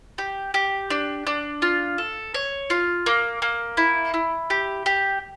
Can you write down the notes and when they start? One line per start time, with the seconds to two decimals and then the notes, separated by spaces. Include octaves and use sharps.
0.18 G4
0.54 G4
0.90 D4
1.27 D4
1.62 F4
1.98 A4
2.34 C#5
2.70 F4
3.06 A#3
3.42 A#3
3.77 E4
4.14 E4
4.50 G4
4.86 G4